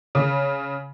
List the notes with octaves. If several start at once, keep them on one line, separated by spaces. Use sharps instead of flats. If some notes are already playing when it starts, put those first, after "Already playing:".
C#3